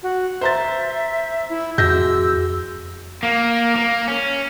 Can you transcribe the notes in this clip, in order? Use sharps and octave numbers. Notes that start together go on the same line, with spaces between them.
F#4
C5 E5 A#5 A6
E4
F2 F#4 G#4 E6 G6 A#6
A#3
A#3
C#4